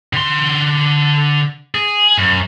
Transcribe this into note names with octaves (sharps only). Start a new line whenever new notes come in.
D3 C6
G#4
F#2